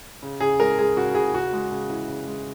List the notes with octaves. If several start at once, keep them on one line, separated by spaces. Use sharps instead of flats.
C#3
C#3 G#4
G#3 A#4
G#3 G#4
C#3 F#4
C#3 G#4
C#3 F#4
G#3
C#3
E3
C#3
G#3